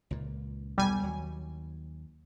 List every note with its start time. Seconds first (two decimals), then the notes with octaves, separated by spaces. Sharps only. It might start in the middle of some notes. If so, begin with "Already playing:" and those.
0.11 C#2 A#2
0.78 B1 E2 G3 G#5
1.03 D#2 F#3